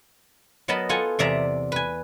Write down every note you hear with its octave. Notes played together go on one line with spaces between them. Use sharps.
F#3 B3 A#4 D#5 A5 B5
F4 A4 F#5 G#5
E2 C3 D5 E5 A#5
B4 G#5